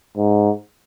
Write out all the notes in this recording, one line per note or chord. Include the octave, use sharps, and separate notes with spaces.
G#2